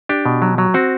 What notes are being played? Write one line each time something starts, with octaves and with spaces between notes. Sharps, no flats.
D4 G4
B2
F#3
F#3
C4 F#4